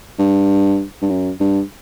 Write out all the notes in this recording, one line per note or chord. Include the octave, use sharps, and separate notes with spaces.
G2
G2
F#2
G2